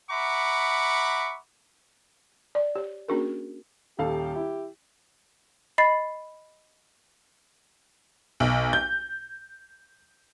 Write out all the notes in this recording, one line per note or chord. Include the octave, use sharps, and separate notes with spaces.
E5 F#5 A#5 B5 C#6 D6
D5
G4 C#5
A#3 C#4 D4 F#4 G#4 A#4
D#1 G4 A4 F5
E4
D#5 B5 A6 C7
B1
G6